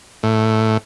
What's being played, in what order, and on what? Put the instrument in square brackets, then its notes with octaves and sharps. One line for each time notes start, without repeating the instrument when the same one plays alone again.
[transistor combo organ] A2